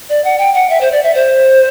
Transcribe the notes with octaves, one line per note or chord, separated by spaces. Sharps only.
D5
F#5
G5
F#5
E5
C5
D5
E5
C5